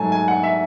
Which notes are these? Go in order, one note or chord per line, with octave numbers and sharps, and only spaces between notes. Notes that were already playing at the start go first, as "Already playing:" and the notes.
Already playing: G#2 F#3 A3 G#5 A5
G#5
F#5
E5